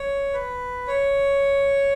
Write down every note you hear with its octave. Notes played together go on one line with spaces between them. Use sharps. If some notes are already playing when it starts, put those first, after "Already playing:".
Already playing: C#5
B4
C#5